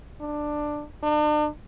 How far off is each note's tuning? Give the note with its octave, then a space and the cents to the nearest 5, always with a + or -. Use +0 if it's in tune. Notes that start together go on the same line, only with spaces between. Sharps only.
D4 +15
D4 +40